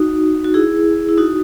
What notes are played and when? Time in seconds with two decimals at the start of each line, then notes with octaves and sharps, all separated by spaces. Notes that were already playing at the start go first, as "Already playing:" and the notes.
Already playing: D#4 F#4
0.44 F#4
0.54 E4 G#4
1.09 E4
1.17 D#4 F#4